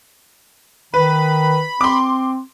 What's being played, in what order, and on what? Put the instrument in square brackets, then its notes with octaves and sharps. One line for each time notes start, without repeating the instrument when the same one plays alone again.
[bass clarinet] D#3 [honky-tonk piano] B4 [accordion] B5
[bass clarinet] C4 [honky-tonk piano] C6 D6